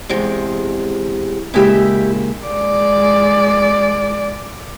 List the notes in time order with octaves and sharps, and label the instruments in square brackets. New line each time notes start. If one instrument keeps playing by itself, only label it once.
[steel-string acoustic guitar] E2 C3 G#3
[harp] A#2 C#3 G#3 [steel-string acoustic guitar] E4 G4 E5
[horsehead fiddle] G#3 D5